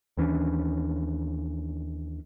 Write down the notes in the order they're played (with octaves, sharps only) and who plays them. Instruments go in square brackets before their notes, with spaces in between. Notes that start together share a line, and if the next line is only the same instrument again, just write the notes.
[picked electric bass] D#2 E3 C#4 D4